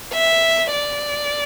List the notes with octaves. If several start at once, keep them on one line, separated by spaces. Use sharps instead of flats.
E5
D5